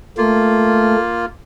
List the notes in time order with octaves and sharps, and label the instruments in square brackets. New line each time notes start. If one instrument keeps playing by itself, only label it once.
[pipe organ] A3 [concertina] A#3 F4